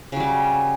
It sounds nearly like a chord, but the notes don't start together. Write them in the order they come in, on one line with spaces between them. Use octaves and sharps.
C#3 F#3 G3